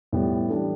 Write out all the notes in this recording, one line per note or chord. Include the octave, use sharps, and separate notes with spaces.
A2 G3 B3
E3 G3 D4 A4